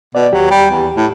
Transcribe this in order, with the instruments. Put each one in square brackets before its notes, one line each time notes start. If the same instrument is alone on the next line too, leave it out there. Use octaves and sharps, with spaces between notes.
[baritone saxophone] B2 [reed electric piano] D5
[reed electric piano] D#2 G4 [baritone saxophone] F#3
[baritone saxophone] G3
E2
A2